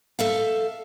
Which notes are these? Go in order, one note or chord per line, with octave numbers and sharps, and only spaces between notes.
A4 E5 F5